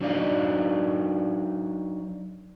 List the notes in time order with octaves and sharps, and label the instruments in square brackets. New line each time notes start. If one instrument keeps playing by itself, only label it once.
[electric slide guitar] F#3 D4 D#4 D5 D#5 F5